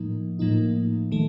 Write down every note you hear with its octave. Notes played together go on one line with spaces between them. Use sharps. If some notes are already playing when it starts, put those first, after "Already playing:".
Already playing: A2 F3 A#3 D#4
A2 F3 A#3 D#4
D#3 A3